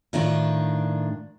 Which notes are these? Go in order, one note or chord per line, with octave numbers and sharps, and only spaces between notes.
A2 D#3 D4 F4